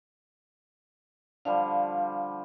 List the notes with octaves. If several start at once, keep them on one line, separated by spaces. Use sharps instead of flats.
D3 F3 G3 F5